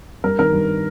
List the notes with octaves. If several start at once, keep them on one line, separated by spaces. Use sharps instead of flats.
G2 A#4
D#3 A#4
G2